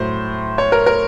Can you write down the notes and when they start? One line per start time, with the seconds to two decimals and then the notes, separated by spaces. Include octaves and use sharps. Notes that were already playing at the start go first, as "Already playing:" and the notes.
Already playing: A2 F#3 C5
0.58 C#5
0.72 A#4
0.86 A#4